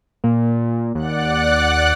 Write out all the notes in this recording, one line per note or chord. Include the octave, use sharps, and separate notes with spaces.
A#2 A#3
D#2 D5 F#5 F#6